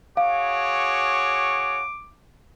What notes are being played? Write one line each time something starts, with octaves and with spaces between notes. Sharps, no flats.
F#4 G#4 C#5 F5 D6